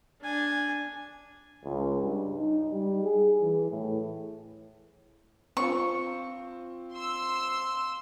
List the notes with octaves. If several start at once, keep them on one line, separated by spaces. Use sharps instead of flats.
D4 G#5
C#2
G2
D#4
G3
G#4
E3
A2
C4 F4 C#6
C6 E6